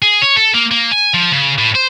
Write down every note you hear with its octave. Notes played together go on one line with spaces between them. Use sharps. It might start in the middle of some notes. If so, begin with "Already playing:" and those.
G#4
C#5
A4
A#3
A#3
G#5
F3
C#3
A2
C5